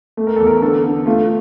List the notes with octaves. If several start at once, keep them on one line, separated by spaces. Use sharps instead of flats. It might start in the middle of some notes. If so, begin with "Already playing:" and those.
A3
A#4
E2 A4
A#4
D3 A4
D3
A3 F4